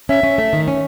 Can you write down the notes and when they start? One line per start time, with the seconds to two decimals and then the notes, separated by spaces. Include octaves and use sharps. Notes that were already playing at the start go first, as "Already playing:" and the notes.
0.09 C#4 E5
0.23 C#4
0.38 A3
0.53 D#3
0.68 C#4